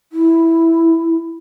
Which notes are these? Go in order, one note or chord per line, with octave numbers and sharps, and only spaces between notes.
E4